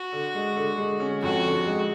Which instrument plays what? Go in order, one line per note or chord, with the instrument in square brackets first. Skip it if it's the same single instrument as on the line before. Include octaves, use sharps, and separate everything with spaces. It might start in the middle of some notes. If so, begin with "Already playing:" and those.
Already playing: [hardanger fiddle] F#4
[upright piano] D3
G#3
D3
G#3
C#4
[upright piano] F2 [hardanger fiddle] F#4
[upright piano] D3
G#3